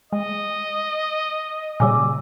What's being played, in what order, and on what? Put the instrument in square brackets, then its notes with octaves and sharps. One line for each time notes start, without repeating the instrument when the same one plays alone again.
[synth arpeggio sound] G#3 [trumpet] D#5
[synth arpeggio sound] A#2 C#3 G3 [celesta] G#5 D6 E6